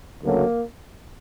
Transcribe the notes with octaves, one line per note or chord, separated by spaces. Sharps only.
D2 C#3 F#3 A3 A#3